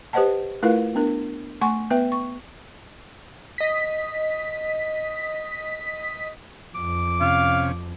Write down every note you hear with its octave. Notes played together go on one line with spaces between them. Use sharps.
G4 B4 C5 D#5 F#5 A5
A3 E4 F4 A#4 B4 F5
B3 D4 A#4
A3 F#5 G#5 C6 C#6
B3 B4 E5 G5
C#6
D#5 B6
F2 D6
C3 C#4 F5